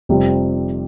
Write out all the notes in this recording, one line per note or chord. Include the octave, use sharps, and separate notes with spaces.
F1 F2 C3 G3 C4